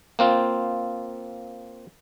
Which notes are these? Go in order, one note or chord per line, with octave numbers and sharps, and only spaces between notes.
A#3 C4 F4